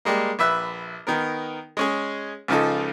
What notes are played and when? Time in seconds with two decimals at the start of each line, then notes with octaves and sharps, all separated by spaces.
0.05 G3 G#3 A#3
0.39 A#1 B4 E5 E6 F#6
1.07 D#3 B3 A#4
1.77 G#3 C#4 G#4
2.48 C#2 C#3 F3 D#4 A4